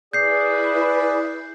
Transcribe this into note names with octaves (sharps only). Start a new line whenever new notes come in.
E4 G#4 B4 D5 G6 C7